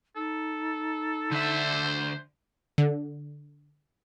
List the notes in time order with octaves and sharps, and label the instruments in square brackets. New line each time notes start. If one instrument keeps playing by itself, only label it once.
[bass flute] D#4 [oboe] A4
[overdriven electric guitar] D3 E5 [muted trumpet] C5
[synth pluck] D3